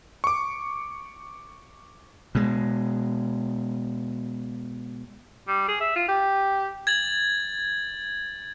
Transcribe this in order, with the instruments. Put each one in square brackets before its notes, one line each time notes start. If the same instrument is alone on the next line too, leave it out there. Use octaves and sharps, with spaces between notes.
[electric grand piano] C#6 D6
[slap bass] B2 G#3
[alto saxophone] G3
G#4
E5
F4
G4
[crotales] G#6 A6 F#7